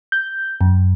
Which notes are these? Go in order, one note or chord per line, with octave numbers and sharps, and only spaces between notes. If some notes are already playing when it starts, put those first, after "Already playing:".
G6
F#2